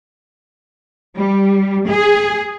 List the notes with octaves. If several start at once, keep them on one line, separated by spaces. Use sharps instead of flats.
G3
G#4